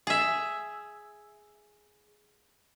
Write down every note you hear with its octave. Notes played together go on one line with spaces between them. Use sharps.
G#4 E5